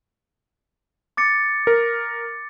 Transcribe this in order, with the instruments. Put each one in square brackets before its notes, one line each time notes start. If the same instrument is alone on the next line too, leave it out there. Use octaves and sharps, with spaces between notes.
[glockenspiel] D6 A6 C#7
[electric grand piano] A#4